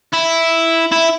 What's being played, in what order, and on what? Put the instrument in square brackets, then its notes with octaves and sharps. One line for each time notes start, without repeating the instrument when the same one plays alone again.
[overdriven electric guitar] E4
E4